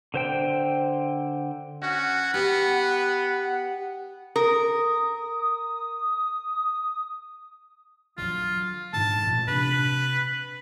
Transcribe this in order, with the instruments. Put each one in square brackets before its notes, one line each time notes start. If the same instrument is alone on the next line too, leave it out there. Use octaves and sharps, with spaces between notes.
[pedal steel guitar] D3 C5 G5
[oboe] C#4 [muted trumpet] F#4 [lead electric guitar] F#5
[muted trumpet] B3 [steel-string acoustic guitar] G4 [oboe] B4
[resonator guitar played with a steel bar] A#4 [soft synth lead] D#6
[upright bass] D3 F#3 [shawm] F4
[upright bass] G#2 D3 [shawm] A5
[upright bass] A1 A#2
[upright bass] C3 D4 [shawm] B4